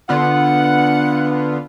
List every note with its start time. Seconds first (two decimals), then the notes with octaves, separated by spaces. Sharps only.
0.09 D3 B3 F4 F#5